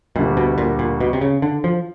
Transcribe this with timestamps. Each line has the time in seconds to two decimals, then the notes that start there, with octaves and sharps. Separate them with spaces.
0.16 D2 A#2 D3 G3
0.37 B2
0.58 A#2
0.79 A#2
1.00 B2
1.13 C3
1.21 C#3
1.42 D3
1.64 F3